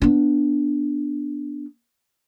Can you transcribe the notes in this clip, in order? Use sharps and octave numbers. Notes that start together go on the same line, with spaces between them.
B3 D4